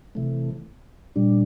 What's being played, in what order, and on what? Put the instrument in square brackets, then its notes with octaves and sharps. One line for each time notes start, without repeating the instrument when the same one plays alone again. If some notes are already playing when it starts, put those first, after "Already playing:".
[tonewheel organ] C3 E3 A3
A#2 G3 D4